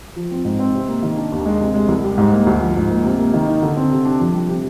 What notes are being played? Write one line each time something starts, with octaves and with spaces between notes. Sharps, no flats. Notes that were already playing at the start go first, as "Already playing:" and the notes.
F3
C4
G#2
C4
C3
A#3
D#3
D4
D#2
G#3
C3
G#3
C2
G3
G#2
A#3
D2
F3
G#2
A#3
C3
A#3
D#3
D#4
D3
C4
C3
D4
F2
G3
C3